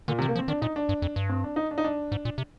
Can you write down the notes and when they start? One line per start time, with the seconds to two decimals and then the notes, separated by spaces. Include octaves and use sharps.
0.08 A#2 D3
0.19 C3
0.22 D#3
0.29 A#3
0.36 F3
0.39 C4
0.48 D#3 D4
0.62 A#2 D#4
0.76 D4
0.89 G2
1.02 F2
1.16 G2
1.29 C4
1.44 D4
1.56 D#4
1.71 D4
1.78 D#4
1.84 D4
2.12 G#2
2.25 A#2
2.38 C3